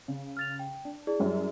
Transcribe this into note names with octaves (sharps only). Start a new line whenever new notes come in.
C#3
F6 A6 F7
G5
D4
E4 G#4 D5
F#2 F#3 G3